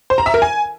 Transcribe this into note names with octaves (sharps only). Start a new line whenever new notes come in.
C5
A#5
E5
A#4
G#5